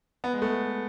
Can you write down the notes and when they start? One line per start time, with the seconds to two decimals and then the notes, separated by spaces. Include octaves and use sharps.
0.24 B3
0.33 G#3
0.42 A3